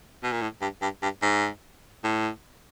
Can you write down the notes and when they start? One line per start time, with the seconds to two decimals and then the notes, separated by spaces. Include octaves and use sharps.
0.23 B2
0.32 A#2
0.41 A2
0.61 G2
0.82 G2
1.02 G2
1.22 G#2
2.04 A2